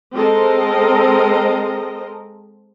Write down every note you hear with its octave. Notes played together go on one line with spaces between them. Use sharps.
G#3 C4 A4 A#4 C5 D#5